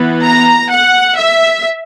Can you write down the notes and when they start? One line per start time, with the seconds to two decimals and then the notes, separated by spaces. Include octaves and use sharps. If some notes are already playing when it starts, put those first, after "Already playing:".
Already playing: E3 B3
0.23 A#5
0.69 F#5
1.16 E5